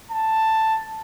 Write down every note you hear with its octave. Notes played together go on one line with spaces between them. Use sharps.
A5